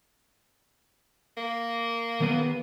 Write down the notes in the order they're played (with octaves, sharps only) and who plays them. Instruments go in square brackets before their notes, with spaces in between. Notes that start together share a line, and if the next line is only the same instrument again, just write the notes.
[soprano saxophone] A#3
[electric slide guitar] D#3 B3 B4